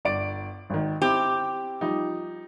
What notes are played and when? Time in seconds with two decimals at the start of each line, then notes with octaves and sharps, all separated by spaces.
0.05 G1 D5 D7
0.70 G#1 D#3
1.02 C4 E4 G4
1.81 F3 G3 D#4